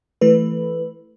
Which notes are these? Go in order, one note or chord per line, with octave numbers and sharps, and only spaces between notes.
E3 A3 B4